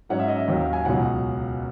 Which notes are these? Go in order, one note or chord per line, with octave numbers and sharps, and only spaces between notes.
G#2 F#3 C#4 F#5
E5
D#5
E5
D#2 D#3 F#3
G#5
C#2 B2 F#3 F#5